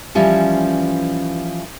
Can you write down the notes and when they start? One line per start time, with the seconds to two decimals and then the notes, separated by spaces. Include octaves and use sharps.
0.15 E3 F3 G3 C#4